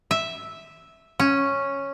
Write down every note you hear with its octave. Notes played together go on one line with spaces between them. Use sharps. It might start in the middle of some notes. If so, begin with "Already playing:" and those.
E5
C#4